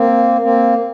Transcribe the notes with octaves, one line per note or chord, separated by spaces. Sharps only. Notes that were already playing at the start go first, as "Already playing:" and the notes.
Already playing: A#3 C4
A#3 C4